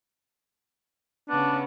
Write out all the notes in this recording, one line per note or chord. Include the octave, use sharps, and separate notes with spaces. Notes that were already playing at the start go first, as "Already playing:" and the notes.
C#3 B3 D4